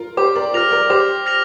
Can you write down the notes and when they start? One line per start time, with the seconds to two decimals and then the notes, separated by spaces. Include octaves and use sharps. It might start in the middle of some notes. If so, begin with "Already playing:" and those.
Already playing: F4 A#4
0.17 G4 C5 D6
0.35 A#4 D5
0.54 F4 A#4 F6 A#6 F7
0.72 A#4 D5
0.90 G4 C5 D6
1.26 F6 A#6 F7